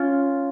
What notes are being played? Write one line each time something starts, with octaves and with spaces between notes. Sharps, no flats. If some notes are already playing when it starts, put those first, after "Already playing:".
Already playing: C#4 F4